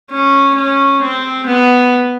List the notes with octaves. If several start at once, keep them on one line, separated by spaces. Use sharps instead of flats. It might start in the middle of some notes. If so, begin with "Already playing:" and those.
C#4
C#4
C4
B3